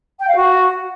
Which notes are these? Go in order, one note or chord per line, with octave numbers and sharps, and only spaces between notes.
G5
F5
F#4